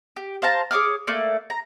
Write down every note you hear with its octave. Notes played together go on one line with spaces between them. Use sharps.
G4
C5 F5 A5 A#5
G#4 C#5 D6 F6
A3 A#3 D5
A#5